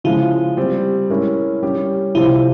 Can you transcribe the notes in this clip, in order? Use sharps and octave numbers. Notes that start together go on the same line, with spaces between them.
C#3 F3 G#3 E4
G3 C4 G4
G#3 C#4 E4 A#4
G3 C#4 G4
C3 F3 C4 E4